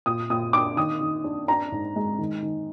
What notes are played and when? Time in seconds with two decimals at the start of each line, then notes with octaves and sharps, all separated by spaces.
0.06 A#2 D#6
0.30 A#2 D#6
0.53 D4 D6
0.77 D#3 D#6
1.01 D#3
1.24 D4
1.48 D4 A#5
1.72 G#2
1.96 G#3
2.19 D#3
2.43 D#3